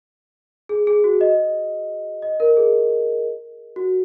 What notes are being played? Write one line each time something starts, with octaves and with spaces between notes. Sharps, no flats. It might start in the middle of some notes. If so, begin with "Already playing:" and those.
G#4
G#4
F#4
D#5
D#5
A#4
G#4
F#4